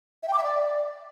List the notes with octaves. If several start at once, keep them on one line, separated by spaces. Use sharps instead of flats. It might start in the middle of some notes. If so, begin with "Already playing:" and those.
E5
G5
D6
E5
D5